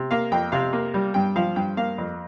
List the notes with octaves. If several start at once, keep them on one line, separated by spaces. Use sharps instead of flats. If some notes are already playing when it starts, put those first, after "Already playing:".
Already playing: C3
A#3 F5
F2 G5
C3 F5
A#3
G3
G2 G5
F3 F5
G2 G5
A#3 F5
F2